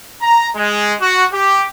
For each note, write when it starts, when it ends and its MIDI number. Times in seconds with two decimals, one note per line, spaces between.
0.22 0.48 82
0.55 0.94 56
1.00 1.25 66
1.32 1.64 67